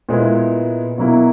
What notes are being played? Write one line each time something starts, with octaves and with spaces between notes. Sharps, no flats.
A#2 G#3 B3 E4
B2 F#3 A#3 E4